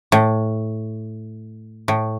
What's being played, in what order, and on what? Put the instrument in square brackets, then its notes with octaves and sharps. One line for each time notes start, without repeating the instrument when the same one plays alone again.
[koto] A2
A2